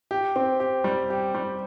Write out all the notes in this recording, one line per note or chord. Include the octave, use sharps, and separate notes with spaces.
G4
C4
G4
G3
G4
G3